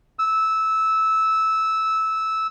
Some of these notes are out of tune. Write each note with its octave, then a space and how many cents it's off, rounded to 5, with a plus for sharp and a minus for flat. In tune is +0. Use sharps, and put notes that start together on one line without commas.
E6 -15